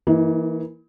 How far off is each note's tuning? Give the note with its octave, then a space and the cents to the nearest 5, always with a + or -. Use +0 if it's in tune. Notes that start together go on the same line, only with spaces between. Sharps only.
E3 +0 A#3 +0 D#4 +35